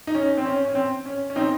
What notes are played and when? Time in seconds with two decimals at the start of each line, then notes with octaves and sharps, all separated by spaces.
0.07 D#4
0.15 C#4
0.37 C4
0.45 C#4
0.65 C#4
0.75 C4
1.06 C#4
1.30 C#4
1.36 C4 D#4